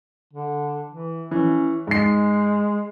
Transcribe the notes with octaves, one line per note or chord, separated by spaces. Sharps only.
D3
E3
E3 C#4
G#2 G#3 C7